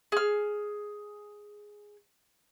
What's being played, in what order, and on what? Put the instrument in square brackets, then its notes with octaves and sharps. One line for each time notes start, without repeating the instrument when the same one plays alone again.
[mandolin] G#4 F6